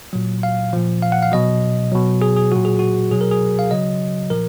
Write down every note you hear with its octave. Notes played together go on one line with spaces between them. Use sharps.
A#2 F#3
F5
A#2 F3
F5
F#5
F5
B2 F#3 D#5
B2 F#3
G#4
G#4
A#2 F#3 F#4
G#4
F#4
B2 F#3 G#4
A#4
G#4
F5
C#3 F#3 D#5
A#2 F3 A#4